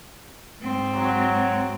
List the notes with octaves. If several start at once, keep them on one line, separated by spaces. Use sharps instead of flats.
G#2 C4
F#3